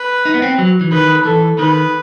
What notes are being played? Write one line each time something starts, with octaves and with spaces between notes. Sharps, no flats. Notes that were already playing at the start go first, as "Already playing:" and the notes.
Already playing: B4
D#4
B3
C4
F#3
E3
D#3 B4
E3 A4
D#3 B4